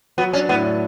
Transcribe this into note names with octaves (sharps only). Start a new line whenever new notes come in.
F#3 B3
C#4 D4
A2 B3
D4